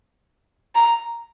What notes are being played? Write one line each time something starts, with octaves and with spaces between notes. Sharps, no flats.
A#5